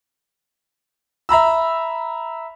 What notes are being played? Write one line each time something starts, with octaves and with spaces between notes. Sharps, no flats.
E5 A#5 B5 E6